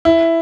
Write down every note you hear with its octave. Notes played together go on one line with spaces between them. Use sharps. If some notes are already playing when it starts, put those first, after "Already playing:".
E4